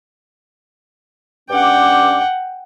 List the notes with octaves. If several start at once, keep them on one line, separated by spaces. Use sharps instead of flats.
G2 C#4 F#5 G5 D6